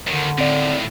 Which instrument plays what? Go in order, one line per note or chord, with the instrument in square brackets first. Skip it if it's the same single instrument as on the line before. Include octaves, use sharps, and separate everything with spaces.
[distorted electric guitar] D#2 D#3 [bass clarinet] D3
[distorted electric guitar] D#2 A2 [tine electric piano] C4 D5